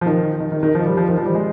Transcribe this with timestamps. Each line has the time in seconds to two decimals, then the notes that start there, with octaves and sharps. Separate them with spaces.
0.01 F3
0.06 D#3
0.40 D#3
0.52 D#3
0.63 D#3
0.75 F3
0.86 G3
0.97 F3
1.09 D#3
1.17 F3
1.25 G3
1.35 G#3